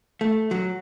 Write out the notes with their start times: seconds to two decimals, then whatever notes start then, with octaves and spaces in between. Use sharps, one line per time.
0.21 A3
0.51 F#3